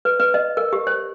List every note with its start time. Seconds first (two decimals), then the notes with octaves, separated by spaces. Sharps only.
0.05 B4
0.19 B4
0.34 D#5
0.57 A#4
0.73 G4
0.87 C5